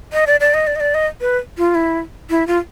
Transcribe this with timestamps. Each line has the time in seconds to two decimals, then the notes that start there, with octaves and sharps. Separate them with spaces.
0.13 D#5
0.27 D5
0.40 D5
0.54 D#5
0.67 D5
0.76 D#5
0.80 D5
0.94 D#5
1.21 B4
1.58 F4
1.75 E4
2.30 E4
2.47 F4